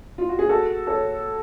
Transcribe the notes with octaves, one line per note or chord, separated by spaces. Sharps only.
F4
F#4
G#4
F#4 A4
A4 C#5